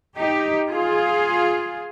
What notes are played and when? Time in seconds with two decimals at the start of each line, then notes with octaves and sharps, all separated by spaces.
0.18 D#4 G4
0.69 F4 G#4